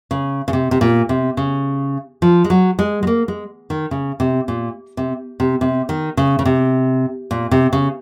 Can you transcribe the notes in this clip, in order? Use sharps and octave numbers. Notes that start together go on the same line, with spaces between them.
C#3
C#3
C3
C3
A#2
C3
C#3
F3
G#3
F#3
G#3
G#3
A#3
G#3
D#3
C#3
C3
A#2
C3
C3
C3
D#3
C#3
C#3
C3
A#2
C3
C#3